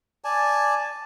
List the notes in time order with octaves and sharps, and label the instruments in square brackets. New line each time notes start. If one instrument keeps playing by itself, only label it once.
[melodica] D5 G#5 A5